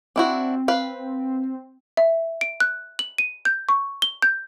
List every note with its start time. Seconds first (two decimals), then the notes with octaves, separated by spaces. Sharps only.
0.16 C4 D4 E4 F#4
0.68 B4 F5
1.97 E5
2.41 D7
2.60 F#6
2.99 F#7
3.18 D#7
3.45 G6
3.69 C#6
4.02 G7
4.22 G6